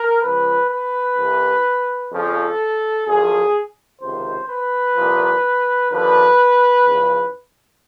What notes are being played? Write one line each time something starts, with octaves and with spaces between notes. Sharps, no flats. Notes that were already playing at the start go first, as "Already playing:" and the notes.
Already playing: A#4
C#2 C#3 F3 B4
B4
C2 C3 E3
F2 C#3 F3 A4
F#2 D3 F3 G#4
C#2 C3 D#3 C5
B4
C2 A#2 F3
D#2 D3 F3 B4
E2 C#3 F3